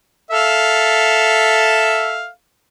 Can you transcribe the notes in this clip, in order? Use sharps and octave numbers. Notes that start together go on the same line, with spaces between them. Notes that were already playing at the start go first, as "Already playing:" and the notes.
A4 E5 F5